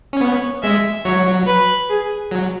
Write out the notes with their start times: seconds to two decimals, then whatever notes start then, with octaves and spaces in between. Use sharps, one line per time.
0.13 C#4
0.20 B3 C#5
0.62 G#3 E5
1.05 F#3 C#5
1.47 B4
1.89 G#4
2.31 F#3